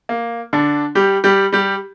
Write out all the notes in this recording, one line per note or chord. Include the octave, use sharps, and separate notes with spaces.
A#3
D3 D4
G3 G4
G3 G4
G3 G4